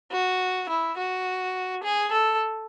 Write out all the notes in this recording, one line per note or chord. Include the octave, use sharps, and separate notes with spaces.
F#4
E4
F#4
G#4
A4